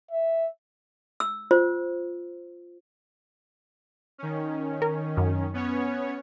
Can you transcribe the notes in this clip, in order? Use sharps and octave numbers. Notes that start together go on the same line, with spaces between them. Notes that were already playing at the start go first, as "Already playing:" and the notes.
E5
E6
F4 C5
D#3 C#4
A#4
F#2
B3 C#4 C#5